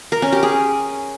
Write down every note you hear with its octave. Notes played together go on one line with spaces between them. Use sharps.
A#4
C#4
G4
G#4